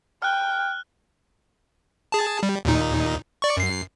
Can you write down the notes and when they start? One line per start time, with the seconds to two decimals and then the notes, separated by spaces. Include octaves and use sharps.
0.22 G5 F6 F#6
2.12 G#4 A5
2.43 G3
2.65 D#2 A#2 D#4
3.42 D5 C#6
3.57 F#2 C7